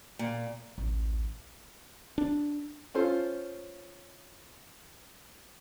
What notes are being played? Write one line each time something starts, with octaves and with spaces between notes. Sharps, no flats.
A#2
A1 D2
D4
C#4 F4 A4 C5